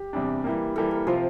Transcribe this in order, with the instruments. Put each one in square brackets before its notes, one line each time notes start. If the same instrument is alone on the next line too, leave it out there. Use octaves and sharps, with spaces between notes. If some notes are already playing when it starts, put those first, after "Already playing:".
Already playing: [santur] G4
[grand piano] E2 C3 G3 D4
E3 G3 A#3
[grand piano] E3 G3 A#3 [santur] A4
[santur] A#4
[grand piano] C3 F3 C4 F4 [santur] C5